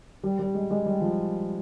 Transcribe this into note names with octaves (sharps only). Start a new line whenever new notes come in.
G3
G3
G#3
G#3
G3
F3